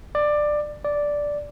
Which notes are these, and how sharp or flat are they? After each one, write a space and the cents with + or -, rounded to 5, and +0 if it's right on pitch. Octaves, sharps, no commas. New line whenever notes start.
D5 +15
D5 -5